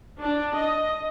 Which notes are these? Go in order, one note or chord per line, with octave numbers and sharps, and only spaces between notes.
D4
D#5